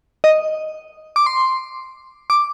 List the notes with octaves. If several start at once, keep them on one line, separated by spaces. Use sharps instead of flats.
D#5
D6
C6
D6